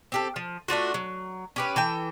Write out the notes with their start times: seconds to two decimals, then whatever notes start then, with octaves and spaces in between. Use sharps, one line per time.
0.12 C4 G4 A4
0.36 F3
0.68 A3 D4 F4 F#4
0.94 F#3
1.56 C#4 G4 B4
1.76 E3 A4 G5